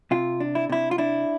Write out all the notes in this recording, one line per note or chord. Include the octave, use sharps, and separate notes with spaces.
C3 F4
D4
E4
C3 E4
F4
D4 E4